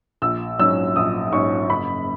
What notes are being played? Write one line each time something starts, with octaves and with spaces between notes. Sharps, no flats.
A#1 E6
G#2 F#3 C#4 E6
A#1 D#6
G#2 F#3 C#4 C#6
F#1 B5